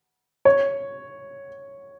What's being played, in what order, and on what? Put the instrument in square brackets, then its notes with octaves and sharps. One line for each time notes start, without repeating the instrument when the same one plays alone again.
[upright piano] C#5